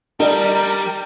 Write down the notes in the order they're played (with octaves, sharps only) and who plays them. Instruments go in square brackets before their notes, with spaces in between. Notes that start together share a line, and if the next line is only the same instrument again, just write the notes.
[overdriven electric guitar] G3 [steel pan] D4 A4 D#5 [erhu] A#4